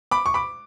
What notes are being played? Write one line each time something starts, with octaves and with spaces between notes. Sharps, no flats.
B5 D6
C#6
B5 D6